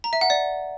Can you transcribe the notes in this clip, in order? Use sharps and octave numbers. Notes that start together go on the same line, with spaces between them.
A#5
E5
F#5
D5